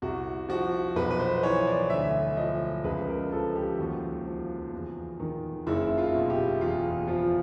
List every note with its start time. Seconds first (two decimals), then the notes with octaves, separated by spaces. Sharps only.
0.02 C2 F#4
0.49 F3 F#4
0.96 B1 B4
1.10 B4
1.19 C5
1.43 E3 C#5
1.67 D5
1.90 D2 E5
2.37 F3 D#5
2.84 C#2 B4
3.07 A#4
3.31 F3 A4
3.56 G4
3.79 D#2 F#4
4.25 F3
4.73 E2
5.20 D#3
5.67 F#1 E4
5.98 F4
6.15 B2
6.30 G4
6.61 E2 F4
7.08 F3 F4